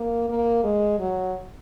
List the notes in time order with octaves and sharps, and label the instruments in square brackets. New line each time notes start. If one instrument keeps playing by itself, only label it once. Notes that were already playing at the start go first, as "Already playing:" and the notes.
Already playing: [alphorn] A#3
A#3
G#3
F#3